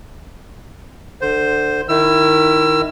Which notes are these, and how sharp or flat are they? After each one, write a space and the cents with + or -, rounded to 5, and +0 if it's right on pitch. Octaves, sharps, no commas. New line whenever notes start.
D3 +20 C5 +0
D#3 -5 E4 +5 E6 +25